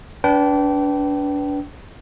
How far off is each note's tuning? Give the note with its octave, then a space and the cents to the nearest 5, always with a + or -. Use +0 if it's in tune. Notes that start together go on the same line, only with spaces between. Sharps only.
D4 -25 B4 +0 G5 -25